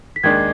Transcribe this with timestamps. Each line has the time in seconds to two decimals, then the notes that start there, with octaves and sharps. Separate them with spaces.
0.16 B6
0.23 D#2 D#3 G#3 D4 G#6